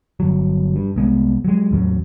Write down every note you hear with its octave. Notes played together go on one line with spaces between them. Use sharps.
G1 F#3
G2
C2 G#3 B3
F#3 G#3
A1 E2 F#3